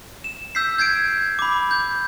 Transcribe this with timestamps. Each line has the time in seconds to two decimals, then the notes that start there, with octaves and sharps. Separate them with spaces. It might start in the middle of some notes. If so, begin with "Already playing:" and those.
0.24 E7
0.55 E6 G6 B6 C7
0.78 G6 G#6 C7 D7
1.39 B5 D6
1.71 G6